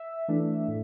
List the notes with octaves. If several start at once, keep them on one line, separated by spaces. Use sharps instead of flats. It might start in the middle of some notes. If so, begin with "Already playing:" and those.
Already playing: E5
E3 A3 D4
A2